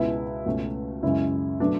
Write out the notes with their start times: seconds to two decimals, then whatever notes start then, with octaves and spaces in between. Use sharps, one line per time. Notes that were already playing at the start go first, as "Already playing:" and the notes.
Already playing: C#2 B2 G#3 B3 E4
0.46 C#2 B2 A3 C#4
1.03 F#2 C#3 G#3 C#4 E4
1.60 B2 F#3 A3 D4